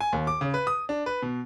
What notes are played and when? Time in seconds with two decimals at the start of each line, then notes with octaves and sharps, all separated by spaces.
0.01 G#5
0.13 D#2
0.27 D6
0.41 C#3
0.54 B4
0.67 D#6
0.89 D4
1.06 B4
1.22 B2